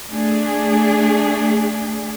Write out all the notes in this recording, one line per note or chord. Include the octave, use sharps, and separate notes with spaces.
A3 D4 G#4